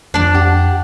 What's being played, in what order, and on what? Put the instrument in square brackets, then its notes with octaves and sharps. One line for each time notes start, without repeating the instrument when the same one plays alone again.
[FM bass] F2 [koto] D4 D5
[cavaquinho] G4 F#5